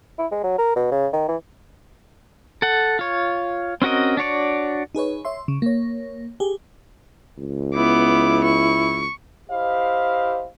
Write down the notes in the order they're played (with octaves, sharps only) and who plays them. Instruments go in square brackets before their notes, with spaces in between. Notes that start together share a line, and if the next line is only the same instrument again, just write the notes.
[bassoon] E4
G#3
F#3
A#4
B2
C#3
D#3
E3
[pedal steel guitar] A4 F#5
F4 C#5
C4 C#4 F#4 A#4 D#5
D4 F#4 C#5 D5
[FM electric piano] D#4 G#4 B4 C#5
C#5 E5 C6
C#3
A#3 C#5
G4 G#4
[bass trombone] C#2
[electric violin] B3 D6 [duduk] E4
[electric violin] C#6
[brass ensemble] E4 G4 C5 D#5 F5